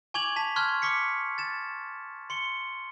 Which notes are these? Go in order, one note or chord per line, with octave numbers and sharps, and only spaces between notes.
G#5 C#6 D6 G#6 F7 F#7
A5 B6 F7
A5 C6 C#6 F6 F#6 G#6
C#6 D6 B6 C#7
A6 E7
C6 C#7 G7